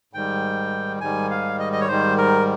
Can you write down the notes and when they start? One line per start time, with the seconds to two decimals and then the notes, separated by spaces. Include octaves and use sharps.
0.13 G#2 D#3 G3 G5
1.01 G#2 D#3 G3 G#5
1.30 F5
1.59 D#5
1.73 D#5
1.81 C#5
1.88 G#2 D#3 G3 C5
2.17 A#4